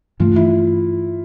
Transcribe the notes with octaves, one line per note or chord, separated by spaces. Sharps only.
G2 E3 A3 F4
E4